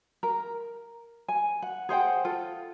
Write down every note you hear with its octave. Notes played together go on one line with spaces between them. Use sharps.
A#4
G#5
F#5
G#4 C5 F#5 G5
F4 A4